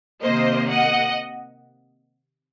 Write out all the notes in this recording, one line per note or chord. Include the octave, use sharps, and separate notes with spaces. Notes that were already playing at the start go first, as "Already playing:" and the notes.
C3 D#3 A#3 C5 D#5
D#5 F#5